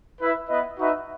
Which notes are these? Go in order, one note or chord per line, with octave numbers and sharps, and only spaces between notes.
E4 B4 E5
B3 E4 B4 D#5
D#4 F#4 B4 E5